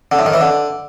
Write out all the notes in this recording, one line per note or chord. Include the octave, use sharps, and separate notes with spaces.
D3
A2
D#3
E3
D3